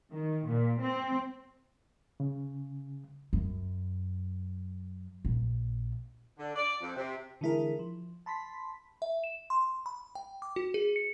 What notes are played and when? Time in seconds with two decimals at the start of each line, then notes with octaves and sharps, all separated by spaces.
0.11 D#3
0.45 A#2
0.81 C4
2.20 C#3
3.33 F#2
5.25 A#1
6.39 D3
6.56 D5
6.82 F2
6.96 C3
7.41 D3 E3 G#3 E4 G#4 A#4
7.79 F3
8.26 A5 B5 C6 B6
9.02 E5
9.24 E7
9.50 C6
9.86 B5
10.15 G5
10.42 D6
10.56 F#4
10.74 G#4
10.96 C#7